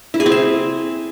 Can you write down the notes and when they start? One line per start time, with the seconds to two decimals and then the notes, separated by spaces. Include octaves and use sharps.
0.14 E4
0.20 G#4
0.26 C4
0.32 E5